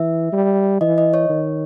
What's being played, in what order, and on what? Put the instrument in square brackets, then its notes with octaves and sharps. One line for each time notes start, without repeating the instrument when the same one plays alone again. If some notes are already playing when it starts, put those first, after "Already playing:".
Already playing: [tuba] E3 [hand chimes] E5
[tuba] G3
[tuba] E3 [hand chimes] D#5
[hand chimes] D#5
C#5
[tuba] D#3